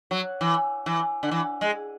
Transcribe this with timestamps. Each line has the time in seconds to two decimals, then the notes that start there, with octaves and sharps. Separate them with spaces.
0.11 F#3
0.41 E3
0.86 E3
1.23 D3
1.31 E3
1.61 G#3